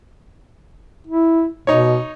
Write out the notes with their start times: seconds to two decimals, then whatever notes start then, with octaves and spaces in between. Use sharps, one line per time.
1.07 E4
1.67 B2 D#4 C#5